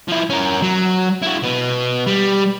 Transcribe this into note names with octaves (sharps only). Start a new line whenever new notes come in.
F3 E4
C#4 A#4
F#3
E4 F#4
B2 B3
G3